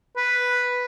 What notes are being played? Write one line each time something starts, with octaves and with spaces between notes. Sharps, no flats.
B4